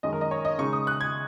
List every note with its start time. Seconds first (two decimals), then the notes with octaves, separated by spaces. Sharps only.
0.03 F#2 D#3 G#3 C#4 D#5
0.13 A#4
0.21 D#5
0.31 C#5
0.45 D#5
0.58 C#3 G#3 D#4 C#6
0.73 D#6
0.87 F#6
1.01 G#6